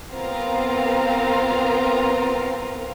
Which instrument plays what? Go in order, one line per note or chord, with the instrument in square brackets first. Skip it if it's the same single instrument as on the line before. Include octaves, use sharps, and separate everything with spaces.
[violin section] B3 C4 F4 A#4 F5 A#5